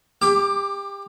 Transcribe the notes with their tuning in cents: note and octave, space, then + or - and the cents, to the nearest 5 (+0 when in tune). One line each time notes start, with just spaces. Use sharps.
G4 +30 D6 +10